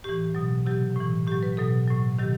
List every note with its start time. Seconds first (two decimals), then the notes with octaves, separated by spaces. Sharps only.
0.04 A2 E3 G4
0.35 B2 F#3
0.66 C3 F#3 G4
0.96 A2 E3
1.27 A2 F#3 G4
1.43 B4
1.57 B2 F#3 A4
1.88 A2 F#3
2.18 C3 D#3 F#3 G4